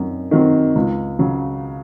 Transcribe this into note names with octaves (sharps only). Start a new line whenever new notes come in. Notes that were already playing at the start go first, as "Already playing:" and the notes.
Already playing: F#2 D#3 C4
D#3 F#3 C4
C#2
C#3 F#3